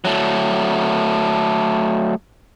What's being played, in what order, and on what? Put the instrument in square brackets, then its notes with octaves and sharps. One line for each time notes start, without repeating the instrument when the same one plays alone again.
[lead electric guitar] F#3 A3